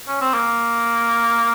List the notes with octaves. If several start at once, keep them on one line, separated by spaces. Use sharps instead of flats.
C#4
C4
A#3